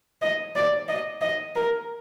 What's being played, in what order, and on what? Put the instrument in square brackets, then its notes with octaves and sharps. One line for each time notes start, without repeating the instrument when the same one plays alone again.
[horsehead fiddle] D#5
D5
D#5
D#5
A#4